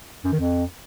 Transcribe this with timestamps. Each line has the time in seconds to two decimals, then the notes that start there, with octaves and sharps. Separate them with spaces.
0.24 F#2
0.32 D#3
0.40 F2